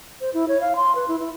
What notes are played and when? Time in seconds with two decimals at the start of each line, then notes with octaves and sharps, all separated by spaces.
0.21 C5
0.34 E4
0.48 C#5
0.61 F5
0.76 C6
0.95 B4
1.08 E4
1.20 E4